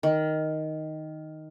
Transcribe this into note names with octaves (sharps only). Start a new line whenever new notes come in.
D#3